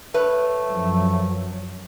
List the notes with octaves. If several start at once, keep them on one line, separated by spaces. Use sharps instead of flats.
A3 B4 C#5
F#2 F3 F#3